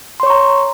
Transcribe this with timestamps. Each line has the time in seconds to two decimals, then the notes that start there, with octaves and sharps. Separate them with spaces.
0.20 C6
0.23 C#5
0.27 C#6
0.30 A#5